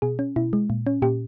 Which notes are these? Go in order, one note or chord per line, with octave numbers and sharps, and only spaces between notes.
B2 G#4
C#4
B2 E4
G#3
A#2
C#4
A#2 G4